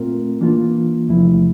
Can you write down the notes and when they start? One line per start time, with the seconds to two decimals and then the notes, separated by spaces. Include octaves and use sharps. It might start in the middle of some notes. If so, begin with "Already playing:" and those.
Already playing: A#2 A3 C4 F4 A#4
0.41 E3 A#3 D4 F4
1.08 E2 C3 F3 A3 E4